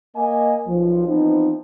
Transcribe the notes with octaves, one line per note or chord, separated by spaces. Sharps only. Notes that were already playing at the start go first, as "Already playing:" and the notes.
A#3 D#5 G#5
B1 F3
E3 F3 B3 C4 D#4